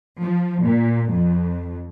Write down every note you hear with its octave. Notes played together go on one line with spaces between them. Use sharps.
F3
A#2
F2